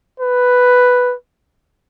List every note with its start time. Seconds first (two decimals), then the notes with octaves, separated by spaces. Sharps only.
0.20 B4